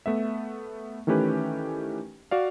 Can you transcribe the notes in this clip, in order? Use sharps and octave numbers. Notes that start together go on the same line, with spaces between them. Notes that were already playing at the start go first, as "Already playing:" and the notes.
A3 B3 E5
D#3 E3 A3 C#4 G4 B4
F#4 D5 F5